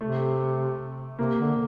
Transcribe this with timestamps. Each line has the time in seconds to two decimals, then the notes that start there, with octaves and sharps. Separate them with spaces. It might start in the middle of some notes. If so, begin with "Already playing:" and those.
0.01 C3 A3
1.19 C3 A#3
1.39 D3